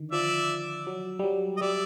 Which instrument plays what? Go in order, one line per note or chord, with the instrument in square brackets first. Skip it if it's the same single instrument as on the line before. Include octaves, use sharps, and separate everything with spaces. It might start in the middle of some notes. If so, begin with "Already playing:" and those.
Already playing: [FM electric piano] D3 D#3
[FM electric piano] F3 [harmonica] D5 E5
[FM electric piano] F#3
G3
F#3
[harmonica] D#5
[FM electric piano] G3 [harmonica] D5 E5